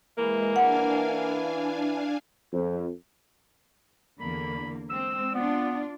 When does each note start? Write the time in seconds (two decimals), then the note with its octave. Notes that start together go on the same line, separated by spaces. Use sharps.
0.18 E3 G#3 A#3
0.56 D4 F5 F#5 G#5
2.54 F2
4.20 E2 D3 A#3 B5
4.90 G#3 C4 E6
5.34 B3 D4 F4 D5